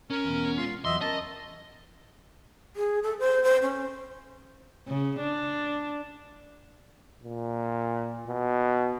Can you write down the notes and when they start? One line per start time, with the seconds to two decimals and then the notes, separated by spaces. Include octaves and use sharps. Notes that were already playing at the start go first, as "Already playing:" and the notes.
0.10 C#4 A#4
0.24 E2 B2
0.57 G#3 F4 C6
0.85 E2 F#3 D#5 E5 C6
1.01 C#4 A#4 D#5 A5
2.76 G#4
3.03 A4
3.19 C5
3.44 C5
3.63 C#4
4.88 C#3
5.20 D4
7.23 A#2
8.27 B2